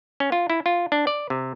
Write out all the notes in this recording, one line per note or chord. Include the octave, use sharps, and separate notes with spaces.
C#4
F4
E4
F4
D4
D5
C3